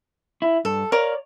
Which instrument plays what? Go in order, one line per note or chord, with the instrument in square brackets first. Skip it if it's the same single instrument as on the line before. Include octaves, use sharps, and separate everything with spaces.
[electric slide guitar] E4
[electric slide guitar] G2 [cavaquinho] A4
[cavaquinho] A#4 F5 D6 [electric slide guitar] C#5 D5